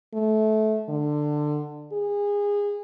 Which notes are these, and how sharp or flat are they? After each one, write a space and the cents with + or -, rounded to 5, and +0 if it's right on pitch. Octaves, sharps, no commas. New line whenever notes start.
A3 -20
D3 +20
G#4 -25